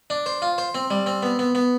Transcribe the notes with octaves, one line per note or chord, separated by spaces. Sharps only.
D4
C5
F4
C5
C4
G3
C4
B3
B3
B3